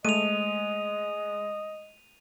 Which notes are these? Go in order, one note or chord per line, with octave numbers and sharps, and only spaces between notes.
G#3 A3 D#5 D#7 F7